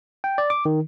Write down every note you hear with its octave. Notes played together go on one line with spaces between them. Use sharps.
G5
D5
D6
D#3